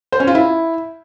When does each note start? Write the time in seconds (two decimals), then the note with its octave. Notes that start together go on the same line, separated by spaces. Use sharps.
0.12 C5
0.20 C#4
0.27 F4
0.35 E4